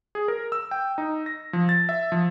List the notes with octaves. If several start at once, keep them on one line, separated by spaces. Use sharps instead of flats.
G#4
A#4
E6
G5
D#4
A#6
F3
A6
E5
F3